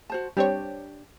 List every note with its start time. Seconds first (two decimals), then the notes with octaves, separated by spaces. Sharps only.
0.10 F#4 C5 A5
0.37 G3 C4 D4 G4 C#5